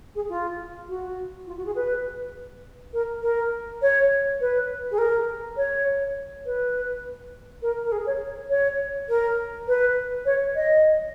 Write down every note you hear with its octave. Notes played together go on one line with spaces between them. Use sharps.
G#4
F4
F#4
F4
F#4
G#4
B4
A#4
A#4
C#5
B4
G#4
A#4
C#5
B4
A#4
A#4
G#4
C#5
C#5
A#4
B4
C#5
D#5